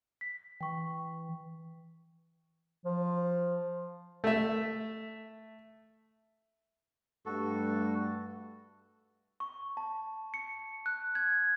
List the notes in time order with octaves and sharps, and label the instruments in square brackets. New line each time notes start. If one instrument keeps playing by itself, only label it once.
[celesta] B6
[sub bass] E3 [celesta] G5 C#6
[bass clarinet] F3
[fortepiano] A3 E5
[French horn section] G2 G3 A3 [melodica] F#4 A4
[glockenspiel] C#6
A5
C#7
F#6
G#6